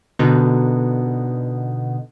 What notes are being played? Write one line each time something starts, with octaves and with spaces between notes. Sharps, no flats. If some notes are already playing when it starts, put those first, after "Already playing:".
B2 D3 B3 D#4